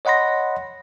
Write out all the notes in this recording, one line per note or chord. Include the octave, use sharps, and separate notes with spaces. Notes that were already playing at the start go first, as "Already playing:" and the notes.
C#5 D#5 F#5 B5 C6 A#6